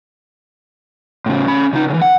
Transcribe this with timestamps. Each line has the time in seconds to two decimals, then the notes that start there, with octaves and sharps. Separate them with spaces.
1.26 A2 C#3
1.48 C#4 B5
1.73 C#3 D#4
1.90 C#3 E3
2.02 F#5